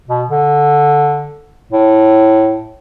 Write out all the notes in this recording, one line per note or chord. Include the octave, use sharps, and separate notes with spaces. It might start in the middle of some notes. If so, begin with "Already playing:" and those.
B2
D3
A2